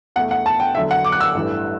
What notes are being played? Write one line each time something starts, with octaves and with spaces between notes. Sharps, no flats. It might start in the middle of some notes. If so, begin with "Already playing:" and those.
E2 B2 A3 F#5
F#5
A5
G5
E2 D3 F#3 E5
F#5
D6
F#6
E6
A1 G2 E3 A3